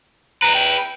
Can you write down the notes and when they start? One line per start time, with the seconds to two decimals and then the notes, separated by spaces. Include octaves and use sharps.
0.42 G#4 B4 A#5
0.55 G5